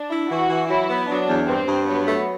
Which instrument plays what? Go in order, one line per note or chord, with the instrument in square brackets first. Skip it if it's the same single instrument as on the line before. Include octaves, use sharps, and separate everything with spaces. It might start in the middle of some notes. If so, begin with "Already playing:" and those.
Already playing: [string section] D4
[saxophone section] E4
[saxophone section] E3 [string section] F#4
[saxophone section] E3
[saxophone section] F#3 [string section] E4
[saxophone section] B3
[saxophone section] F#3 [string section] D4
[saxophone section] E2
[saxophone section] G2 [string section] C4
[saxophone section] G2
[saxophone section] F#3 [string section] B3
[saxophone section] A3